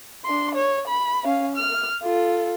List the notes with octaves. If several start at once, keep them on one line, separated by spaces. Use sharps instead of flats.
D4 C6
C#5
B5
C#4 F5
F6
F4 A4